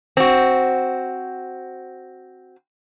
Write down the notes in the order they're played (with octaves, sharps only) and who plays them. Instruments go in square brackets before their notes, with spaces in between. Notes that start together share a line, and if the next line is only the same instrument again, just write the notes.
[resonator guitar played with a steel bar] C4 F#4